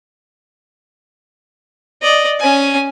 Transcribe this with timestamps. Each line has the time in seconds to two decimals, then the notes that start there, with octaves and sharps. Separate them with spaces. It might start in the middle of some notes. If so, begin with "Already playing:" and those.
2.02 D5 D#5
2.39 C#4 G#5